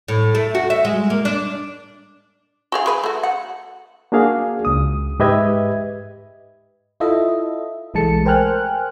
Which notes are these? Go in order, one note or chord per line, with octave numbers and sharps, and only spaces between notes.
A2
A3
F#4
E5
G#3
A#3
D4
F#4 G#4 F5
G#3 B4
A3 F#4
F#5
A#3 D4 F#4 G#4 F5
C#2 D#6
G#2 G4 B4 D#5 E5 G#6
E4 F4 A4 D#5 E5
B1 E3 G#3 A3 A5 C#7
A#4 C5 G5 G#5 F6 F#6